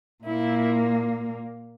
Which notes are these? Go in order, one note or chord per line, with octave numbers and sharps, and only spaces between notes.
A#2 A#3 E4